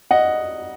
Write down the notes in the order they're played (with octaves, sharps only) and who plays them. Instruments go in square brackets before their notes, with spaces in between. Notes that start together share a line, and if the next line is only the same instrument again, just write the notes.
[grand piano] D#5 F#5